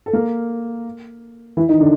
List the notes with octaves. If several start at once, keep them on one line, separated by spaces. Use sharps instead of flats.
A4
A#3 A#4
E3 E4
D#3 D#4
D3 D4